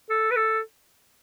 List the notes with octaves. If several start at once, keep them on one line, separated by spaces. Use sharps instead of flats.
A4
B4
A4